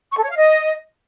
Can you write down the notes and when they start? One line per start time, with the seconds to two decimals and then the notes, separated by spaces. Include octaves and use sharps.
0.11 C#6
0.17 A4
0.24 C#5
0.30 F5
0.36 D#5